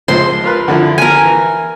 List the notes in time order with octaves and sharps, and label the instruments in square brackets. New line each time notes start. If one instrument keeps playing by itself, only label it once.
[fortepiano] C#2 F3 C5 [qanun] C6
[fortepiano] F4 A#4 B4
D3 F3 E4
[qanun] A#4 G#5
[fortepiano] E3